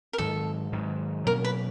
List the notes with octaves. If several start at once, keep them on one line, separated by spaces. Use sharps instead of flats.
A#4
G#2 D#3 F#3 A4
G#2 D#3 F#3
B2 F#3 A#3 C#4 A#4
B4